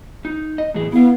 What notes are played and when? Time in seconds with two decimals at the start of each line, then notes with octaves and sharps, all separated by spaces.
0.25 D#4
0.58 D#5
0.74 A2 E3 G#4
0.92 B3 E4 F5